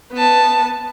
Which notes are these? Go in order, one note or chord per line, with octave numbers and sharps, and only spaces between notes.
B3 A5